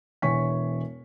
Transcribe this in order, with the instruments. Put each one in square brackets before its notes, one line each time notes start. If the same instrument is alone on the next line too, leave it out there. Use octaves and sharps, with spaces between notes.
[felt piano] E1 E3 C#5 G#5 C#6 B6